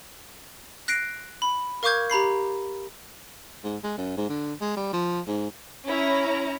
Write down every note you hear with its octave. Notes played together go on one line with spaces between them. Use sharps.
F#6 A#6 C7 D7
B5
A#4 F5 C#6 D6 G6 G#6
G4 A#5 B5 C7
G#2
G#3
F#2
G#2
D3
G#3
G3
F3
G#2
C#4 E4 A#5